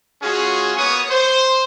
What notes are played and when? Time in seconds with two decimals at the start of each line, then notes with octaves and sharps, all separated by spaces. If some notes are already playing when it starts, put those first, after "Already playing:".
0.23 G#3 C#4 F4 F#4 G#4
0.77 A#3 B3 C#5 F#5 C#6 D#6
1.10 C5